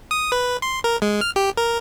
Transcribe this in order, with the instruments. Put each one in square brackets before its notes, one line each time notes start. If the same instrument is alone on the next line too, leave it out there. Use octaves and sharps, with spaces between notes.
[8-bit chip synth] D#6
B4
C6
A#4
G#3
F6
G4
A#4